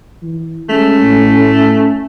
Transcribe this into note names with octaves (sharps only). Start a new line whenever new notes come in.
E3
G#3 A3 C#4
A2